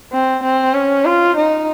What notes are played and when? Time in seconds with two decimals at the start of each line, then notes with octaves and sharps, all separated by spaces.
0.13 C4
0.44 C4
0.74 C#4
1.05 F4
1.36 D#4